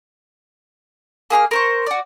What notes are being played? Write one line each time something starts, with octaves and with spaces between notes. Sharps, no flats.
A#3 G#4 B5 F6
A#4 C5 C#6
F#4 D5